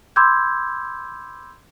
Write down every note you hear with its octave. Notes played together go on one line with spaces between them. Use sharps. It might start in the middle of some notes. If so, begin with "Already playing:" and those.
B5 C6 D6 E6 G6 G#6